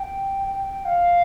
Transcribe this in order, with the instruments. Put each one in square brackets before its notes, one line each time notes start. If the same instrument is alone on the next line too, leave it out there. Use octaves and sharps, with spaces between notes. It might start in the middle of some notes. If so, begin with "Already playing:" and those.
Already playing: [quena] G5
F5